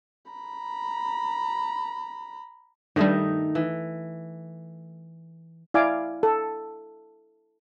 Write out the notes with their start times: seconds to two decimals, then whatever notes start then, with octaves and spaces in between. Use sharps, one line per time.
0.32 A#5 B5
2.96 G2 D#3 G3 A3 D#4
3.55 E3
5.74 E4 D5 F5 G#5 D6
6.23 A4